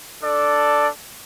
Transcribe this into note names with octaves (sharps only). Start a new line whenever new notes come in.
D4 A4 D5